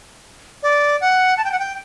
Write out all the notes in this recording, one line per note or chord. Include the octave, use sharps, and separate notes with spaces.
D5
F#5
A5
G5
F#5
G5